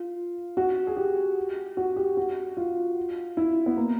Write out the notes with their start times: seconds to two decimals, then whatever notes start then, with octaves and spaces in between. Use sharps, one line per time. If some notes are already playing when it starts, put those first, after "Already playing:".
Already playing: F4
0.57 F#4
0.87 G#4
0.96 G4
1.77 F#4
1.96 G4
2.17 F#4
2.57 F4
3.37 E4
3.66 B3
3.77 A#3